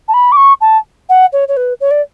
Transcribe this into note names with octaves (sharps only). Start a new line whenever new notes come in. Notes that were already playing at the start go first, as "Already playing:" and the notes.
A5
B5
D6
C#6
A5
F#5
C#5
C#5
B4
C#5
D5